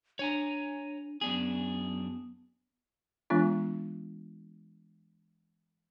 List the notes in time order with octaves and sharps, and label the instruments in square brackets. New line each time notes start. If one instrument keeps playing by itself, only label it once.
[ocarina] D4 [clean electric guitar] C#5 G#5 A#5
[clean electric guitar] F#2 D4 G#4 [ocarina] B3
[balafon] E3 G#3 B3 D4 F4